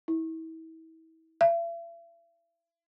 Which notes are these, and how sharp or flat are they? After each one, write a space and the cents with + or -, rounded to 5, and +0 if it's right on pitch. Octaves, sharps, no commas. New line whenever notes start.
E4 -35
E5 +45